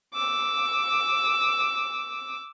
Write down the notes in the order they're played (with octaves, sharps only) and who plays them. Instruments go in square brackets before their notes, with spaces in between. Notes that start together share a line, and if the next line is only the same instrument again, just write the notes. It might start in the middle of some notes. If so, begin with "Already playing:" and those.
[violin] D6 E6